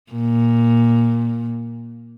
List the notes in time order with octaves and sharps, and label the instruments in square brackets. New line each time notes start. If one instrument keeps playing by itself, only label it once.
[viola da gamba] A#2